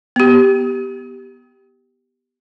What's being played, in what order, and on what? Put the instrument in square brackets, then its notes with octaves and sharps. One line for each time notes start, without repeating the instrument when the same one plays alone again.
[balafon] B3 G4